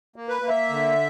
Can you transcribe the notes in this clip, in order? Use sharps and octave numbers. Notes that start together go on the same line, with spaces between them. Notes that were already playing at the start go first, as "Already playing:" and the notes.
A#3
B4
A#3
E5
D3